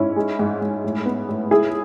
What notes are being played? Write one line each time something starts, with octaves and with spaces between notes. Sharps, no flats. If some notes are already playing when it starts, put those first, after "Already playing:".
Already playing: G#2 C#4 E4
G#3
G#2
G#2
A2
B3
A2
C#2 E4 G#4